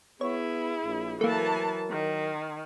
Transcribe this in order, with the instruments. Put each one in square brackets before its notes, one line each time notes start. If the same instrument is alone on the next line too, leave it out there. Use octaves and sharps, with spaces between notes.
[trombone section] B3 [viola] E4 G#4 [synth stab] C#5
[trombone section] A#1
[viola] E3 A5 [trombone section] F#3 A#4 [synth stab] A3 A#3
[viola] D#3